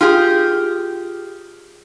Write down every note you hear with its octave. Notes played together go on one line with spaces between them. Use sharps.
F4 G4 G#4